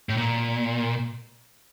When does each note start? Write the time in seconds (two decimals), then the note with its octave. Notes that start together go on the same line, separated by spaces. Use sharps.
0.09 A2
0.17 A#2